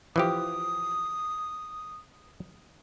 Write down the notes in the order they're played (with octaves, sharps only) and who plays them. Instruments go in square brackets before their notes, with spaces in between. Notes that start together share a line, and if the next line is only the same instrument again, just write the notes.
[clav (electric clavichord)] E3 F3 G4 [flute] D#6